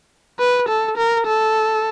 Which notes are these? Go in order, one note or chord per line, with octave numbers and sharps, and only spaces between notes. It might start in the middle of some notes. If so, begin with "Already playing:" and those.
B4
A4
A#4
A4